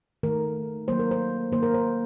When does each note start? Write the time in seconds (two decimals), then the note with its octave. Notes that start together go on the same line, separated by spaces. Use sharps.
0.23 D#3 A3 A#4
0.88 D#3 F#3 A#3 C5
0.99 A#4
1.11 C5
1.52 D#3 A#3 C5
1.63 A#4
1.74 C5